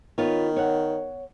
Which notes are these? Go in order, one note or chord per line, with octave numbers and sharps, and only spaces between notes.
D#3 B3 F4 C#5
C#5 F#5